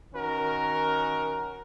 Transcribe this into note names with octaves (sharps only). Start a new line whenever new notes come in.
D#3 C#4 F#4 A#4